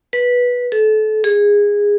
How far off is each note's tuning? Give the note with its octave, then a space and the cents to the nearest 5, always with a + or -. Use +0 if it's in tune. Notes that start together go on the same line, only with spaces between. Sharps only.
B4 -10
A4 -30
G#4 -15